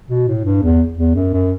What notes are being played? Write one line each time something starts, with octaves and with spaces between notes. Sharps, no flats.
B2
A2
G2
E2
E2
F#2
F#2